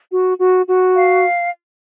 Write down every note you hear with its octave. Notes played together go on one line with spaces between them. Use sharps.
F#4
F#4
F#4
F5